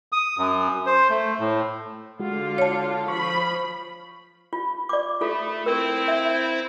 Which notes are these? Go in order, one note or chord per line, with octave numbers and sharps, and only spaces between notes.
D#6
F#2
C5
A3
A2
D3 G#3 F4 F#4
C#5 A5
F3 B5 C#6
F4
D5 D6
A3 F4 A4
C4 E4 A#4 C5
E5